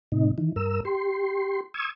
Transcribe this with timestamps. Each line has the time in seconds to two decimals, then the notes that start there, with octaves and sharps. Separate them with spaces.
0.12 A2 C3 D#4
0.38 D#3 E3
0.56 G2 A#4 E6
0.85 G4 C6
1.74 C#6 D#6 E6 G#6